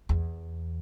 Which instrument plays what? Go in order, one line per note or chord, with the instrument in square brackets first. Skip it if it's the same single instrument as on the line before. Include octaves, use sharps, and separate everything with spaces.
[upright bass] E2